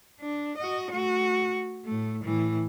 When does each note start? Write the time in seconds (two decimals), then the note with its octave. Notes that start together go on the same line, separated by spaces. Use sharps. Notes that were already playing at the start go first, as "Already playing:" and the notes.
0.20 D4
0.57 F#4 D#5
0.91 A3 F#4
1.85 A2 A3
2.24 A2 E3